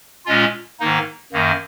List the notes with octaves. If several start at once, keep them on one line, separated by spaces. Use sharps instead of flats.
A#2 G#3 C#4 F4
G#2 D#3 A#3 D#4
F#2 D#3 A#3